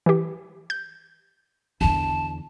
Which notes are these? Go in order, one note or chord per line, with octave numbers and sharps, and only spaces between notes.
E3 G4
G6
E2 D3 A5